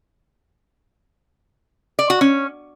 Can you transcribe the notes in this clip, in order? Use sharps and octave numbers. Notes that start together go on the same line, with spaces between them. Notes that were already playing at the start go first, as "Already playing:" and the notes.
D5
F#4
C#4